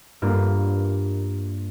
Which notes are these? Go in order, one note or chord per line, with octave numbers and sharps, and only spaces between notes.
G2 A#3 F4